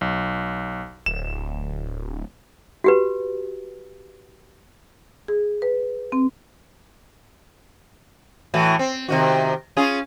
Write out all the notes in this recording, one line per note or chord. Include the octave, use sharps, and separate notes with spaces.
B1
D1 E7
F#4 G4 B4
G#4
B4
C4
A2 E3 F#4
C4
C3 D#3 F#4
C#4 F4 G#4